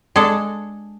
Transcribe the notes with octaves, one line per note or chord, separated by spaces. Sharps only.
G#3 D4 A4